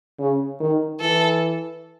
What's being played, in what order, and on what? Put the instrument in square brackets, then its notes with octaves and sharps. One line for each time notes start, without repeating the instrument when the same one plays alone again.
[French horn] C#3
D#3
[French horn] E3 [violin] A4